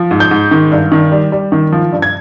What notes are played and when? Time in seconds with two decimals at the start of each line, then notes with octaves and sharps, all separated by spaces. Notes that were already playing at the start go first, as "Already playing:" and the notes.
Already playing: F3
0.11 G#2
0.20 G6
0.31 G#2
0.51 D#3
0.71 G2
0.92 D#3
1.12 G3
1.32 G3
1.52 D#3
1.73 F3
1.92 G2
2.02 G#6